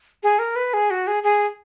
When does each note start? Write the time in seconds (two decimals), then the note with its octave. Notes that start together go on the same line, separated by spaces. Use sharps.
0.23 G#4
0.39 A#4
0.56 B4
0.74 G#4
0.90 F#4
1.07 G#4
1.23 G#4